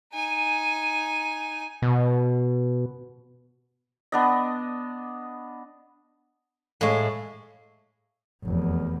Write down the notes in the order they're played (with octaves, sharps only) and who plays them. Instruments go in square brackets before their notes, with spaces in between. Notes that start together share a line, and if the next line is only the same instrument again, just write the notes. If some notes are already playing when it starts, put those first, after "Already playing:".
[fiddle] D#4 G#5
[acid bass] B2
[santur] B3 D4 D#5
[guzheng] A2 G#3 [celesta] F5 C#6
[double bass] F1 E2